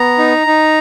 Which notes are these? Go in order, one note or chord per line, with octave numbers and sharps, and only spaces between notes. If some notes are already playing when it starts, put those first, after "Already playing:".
Already playing: B3 A#5
D#4
D#4